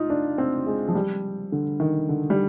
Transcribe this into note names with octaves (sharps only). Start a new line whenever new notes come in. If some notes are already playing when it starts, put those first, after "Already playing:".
Already playing: D#4 F4
D4
C4
G#3
F3
G3
D3
D#3
D3
G3